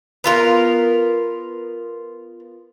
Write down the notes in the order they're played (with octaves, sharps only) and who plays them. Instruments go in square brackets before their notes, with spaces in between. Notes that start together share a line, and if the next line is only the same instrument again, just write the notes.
[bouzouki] B3 F4 A#4